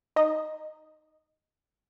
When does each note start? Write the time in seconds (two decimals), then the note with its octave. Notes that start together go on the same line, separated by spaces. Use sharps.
0.16 D#4 D#5